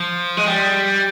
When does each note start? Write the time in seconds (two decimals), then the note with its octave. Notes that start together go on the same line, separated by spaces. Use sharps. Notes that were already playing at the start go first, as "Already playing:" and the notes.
Already playing: F3
0.37 G#3
0.47 G3